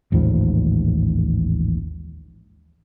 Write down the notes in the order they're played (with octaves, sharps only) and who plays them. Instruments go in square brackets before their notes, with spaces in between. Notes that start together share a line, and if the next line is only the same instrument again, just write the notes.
[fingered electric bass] A1 D#2 G#2 F3